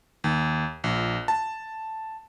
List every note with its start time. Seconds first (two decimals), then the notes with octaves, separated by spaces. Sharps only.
0.24 D#2
0.84 A#1
1.28 A5